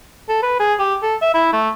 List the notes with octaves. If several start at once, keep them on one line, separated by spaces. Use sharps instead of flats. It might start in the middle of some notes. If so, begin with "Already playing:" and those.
A4
B4
G#4
G4
A4
E5
E4
A3